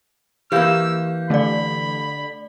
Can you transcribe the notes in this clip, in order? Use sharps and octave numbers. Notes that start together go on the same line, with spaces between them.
E3 A#3 G4 F5 E6 G6
D3 A3 D5 B5